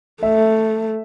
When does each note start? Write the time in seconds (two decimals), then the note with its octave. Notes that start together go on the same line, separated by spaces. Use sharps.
0.23 A3 E5